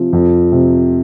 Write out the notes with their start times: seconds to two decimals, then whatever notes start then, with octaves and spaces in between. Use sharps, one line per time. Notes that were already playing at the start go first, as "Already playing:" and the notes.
Already playing: C3 F3
0.13 F2
0.52 C3